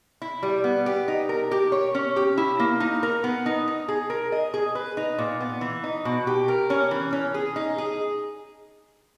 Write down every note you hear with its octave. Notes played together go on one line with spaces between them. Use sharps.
E4
G3
B3
G4
D#4
A#4
G4
C#5
C#4
G4
E4
A#3
D#4
A#4
B3
D#4
D#4
G#4
A#4
D#5
G#4
B4
D#4
A#2
B3
E3
D#4
B2
G4
A#4
C#4
E3
C#4
G#4
D#4
G#4